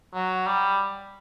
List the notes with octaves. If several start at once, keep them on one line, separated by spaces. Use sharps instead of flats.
F#3
G3